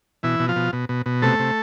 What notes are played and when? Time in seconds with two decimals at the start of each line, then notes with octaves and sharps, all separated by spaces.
0.23 B2 E3 E4
0.40 B2
0.48 F3 F4
0.56 B2
0.73 B2
0.89 B2
1.06 B2
1.22 C3 A3 A4
1.39 C3